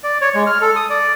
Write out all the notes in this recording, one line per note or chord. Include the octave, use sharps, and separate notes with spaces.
D5
C#5
G#3
F6
A4
D#6
D5